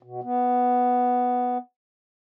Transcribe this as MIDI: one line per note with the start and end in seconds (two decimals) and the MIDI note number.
0.03 0.21 47
0.23 1.58 59